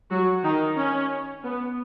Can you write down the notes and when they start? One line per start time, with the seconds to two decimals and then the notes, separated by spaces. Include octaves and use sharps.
0.10 F#3 F#4
0.44 D#3 D#4
0.77 C#4
1.43 B3